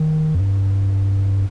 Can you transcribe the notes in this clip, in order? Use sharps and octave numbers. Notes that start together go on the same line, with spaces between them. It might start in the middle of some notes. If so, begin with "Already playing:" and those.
Already playing: D#3
F2
G2